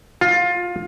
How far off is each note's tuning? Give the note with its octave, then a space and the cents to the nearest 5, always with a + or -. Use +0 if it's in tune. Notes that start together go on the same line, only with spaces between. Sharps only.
F4 +20